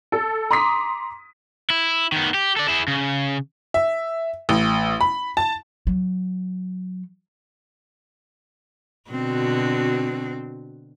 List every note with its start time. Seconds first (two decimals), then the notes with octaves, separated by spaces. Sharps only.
0.12 A4
0.51 A#5 C6 D6 D#6 B6
1.70 E4
2.12 D#3 B3
2.34 G4
2.57 A4 D5
2.68 E4 G#4
2.88 C#3
3.74 E5
4.49 A1
5.01 B5
5.37 A5
5.87 F#3
9.11 B2 D3 C4 F#4